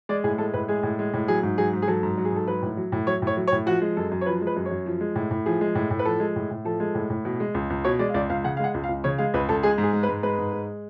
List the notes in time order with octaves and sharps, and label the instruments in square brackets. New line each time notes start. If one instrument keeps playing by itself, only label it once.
[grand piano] G#3 D5
A2 G#4
G#3 A4
A2 B4
G#3 G#4
A2
G#3
A2
F#3 G#4
G#2
F#3 G#4
G#2
G#4
F#3 A4
G#2
F#3
G#4
G#2 A4
F#3 B4
A2
F#3
A2
F#3 C#5
A2
C#5
F#3
C#5
A2
F3 F#4
G#3
F#2 A4
F#2
C#5
F3 B4
G#3
B4
F#2
C#5
F#2
F3
G#3
A2
A2
F3 G#4
G#3
A2
A2
B4
F3 A4
G#3
A2
A2
F3 A4
G#3
A2
A2
B2
G#3
C#2
C#2
B2 C#5
G#3 D5
F5
C#2 D5
C#2 F5
C#3 F#5
F5
G#3 F#5
C#2
F5
C#2
C#3 C#5
G#3 F5
C#2 B4
C#2 A4
G#3 G#4
G#2
G#4
G#3
B4
G#2
G#3 B4
G#2
G#3